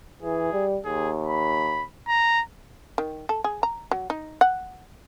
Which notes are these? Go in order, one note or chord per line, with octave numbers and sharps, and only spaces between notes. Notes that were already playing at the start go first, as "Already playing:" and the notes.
E3 G#4
G3
D#2 G#4
B5
A#5
D#3
A4
G#4
A#5
F#3
D#4
F#5